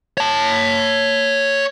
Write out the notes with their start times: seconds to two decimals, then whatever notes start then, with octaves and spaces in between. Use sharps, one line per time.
0.18 C#5 A5